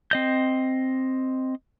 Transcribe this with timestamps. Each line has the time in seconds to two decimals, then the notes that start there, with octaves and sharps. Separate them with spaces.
0.11 C4 D#5 G6